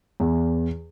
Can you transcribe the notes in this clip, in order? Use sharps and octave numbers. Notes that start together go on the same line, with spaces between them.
E2